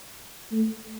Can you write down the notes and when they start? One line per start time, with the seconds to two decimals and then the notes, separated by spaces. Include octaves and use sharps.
0.52 A3